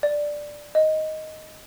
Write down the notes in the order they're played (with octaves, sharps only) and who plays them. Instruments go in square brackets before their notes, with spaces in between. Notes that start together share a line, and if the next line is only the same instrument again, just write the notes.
[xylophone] D5
D#5